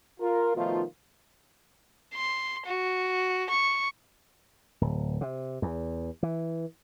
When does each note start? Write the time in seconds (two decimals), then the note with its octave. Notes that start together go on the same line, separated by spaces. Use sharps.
0.20 F4 A#4
0.55 B2 D#3 F3 A3 D#4 F4
2.14 C6
2.66 F#4
3.50 C#6
4.81 D1
5.21 C3
5.62 E2
6.23 E3